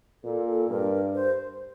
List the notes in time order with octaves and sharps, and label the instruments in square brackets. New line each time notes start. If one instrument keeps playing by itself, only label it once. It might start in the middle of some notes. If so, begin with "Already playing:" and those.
[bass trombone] A#2 [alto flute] A4
[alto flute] A4
[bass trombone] G2 [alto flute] A#4
[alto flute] C5